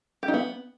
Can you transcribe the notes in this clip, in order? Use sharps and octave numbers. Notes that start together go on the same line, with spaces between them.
G4
D#4
B3